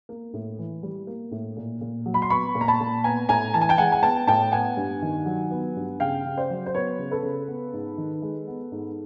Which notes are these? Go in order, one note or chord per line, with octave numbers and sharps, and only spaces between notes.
A#3
A2
E3
G3
A#3
A2
A#2
A#2
F#3
B5
C6
B3 B5 C#6
A#2
A#5
A5 B5
A#2
B3 G#5 A#5
A2 G#5 A#5
E3 A5
G#5
G5 A5
G#3 F#5 G#5
G#5
B3 G5 A5
A2 G5 A5
B3 F#5 G#5
G2
D#3
F#3
B3
G2
C#3 F5 G5
C#3
C5 D5
F#3
C5
B3 B4 C#5
C#3
A4 B4
C#3
B3
G#2
D#3
G#3
B3
G#2